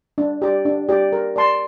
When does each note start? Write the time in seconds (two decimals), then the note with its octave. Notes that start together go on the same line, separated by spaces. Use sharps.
0.18 D4
0.42 G4 D5
0.65 D4
0.89 G4 D5
1.13 A#4
1.36 D5 A5 C6